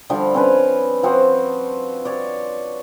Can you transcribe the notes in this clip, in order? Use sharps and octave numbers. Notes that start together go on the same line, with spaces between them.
D3 F3 G3
C4 C#4 B4
F3 C4 F#4
C#5 D5